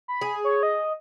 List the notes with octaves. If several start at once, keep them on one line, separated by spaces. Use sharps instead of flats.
B5
G#4
C#5
D#5